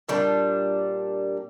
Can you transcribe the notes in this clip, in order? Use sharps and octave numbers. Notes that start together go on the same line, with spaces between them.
A#2 G3 D4